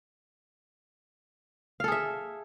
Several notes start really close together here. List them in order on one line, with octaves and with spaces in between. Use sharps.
F5 A4 G#4 E5